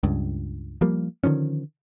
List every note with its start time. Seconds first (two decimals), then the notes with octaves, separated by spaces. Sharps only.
0.03 C#2 G2
0.81 F3 G3 A#3
1.24 D3 D#3 F3 C#4